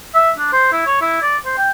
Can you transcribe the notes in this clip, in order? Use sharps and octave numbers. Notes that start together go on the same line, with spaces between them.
E5
D4
C5
E4
C#5
E4
D5
C5
G5